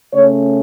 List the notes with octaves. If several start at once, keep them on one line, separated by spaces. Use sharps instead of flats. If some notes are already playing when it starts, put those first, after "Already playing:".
C#3 A3 C#4 C#5